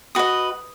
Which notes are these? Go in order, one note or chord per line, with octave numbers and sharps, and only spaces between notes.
F#4 B4 D#5 D#6